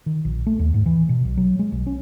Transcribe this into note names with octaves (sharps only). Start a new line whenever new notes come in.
D#3
A#1
A3
D#2
G#2
E3
B2
B1
F#3
G#3
B1
C#4